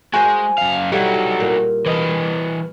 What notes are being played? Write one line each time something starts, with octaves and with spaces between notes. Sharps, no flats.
G#3 F#4 C5 G#5
F#2 F5
F#3 G3 D#4 E4 G4 A4 F#5
A#2
E3 B4 D#5